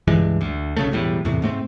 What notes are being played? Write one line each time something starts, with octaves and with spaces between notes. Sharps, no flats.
C#2 G2 E3 G#3
D2
B1 C#3 A3
E1 E2 A2 G3
E2 A2 C3
G#2 A3 C4